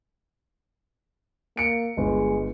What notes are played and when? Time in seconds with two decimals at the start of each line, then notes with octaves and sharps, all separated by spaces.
1.57 A#3 C#7 D7
1.97 G1 G#3